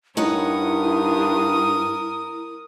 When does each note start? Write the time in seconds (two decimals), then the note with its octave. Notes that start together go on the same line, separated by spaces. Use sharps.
0.17 G2 D#4 E4 A#4 C#5 F#5 D#6